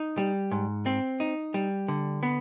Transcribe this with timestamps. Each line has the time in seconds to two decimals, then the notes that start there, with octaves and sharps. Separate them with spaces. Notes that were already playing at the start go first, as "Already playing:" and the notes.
Already playing: D#4
0.18 G3
0.51 G#2
0.86 C4
1.20 D#4
1.54 G3
1.88 D3
2.23 B3